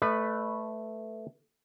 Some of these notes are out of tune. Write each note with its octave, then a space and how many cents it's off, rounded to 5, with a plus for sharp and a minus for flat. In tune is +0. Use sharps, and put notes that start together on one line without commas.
A3 +0 B4 +0 D#5 -45